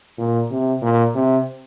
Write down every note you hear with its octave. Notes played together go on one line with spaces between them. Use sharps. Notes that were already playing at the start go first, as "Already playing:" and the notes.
A#2
C3
A#2
C3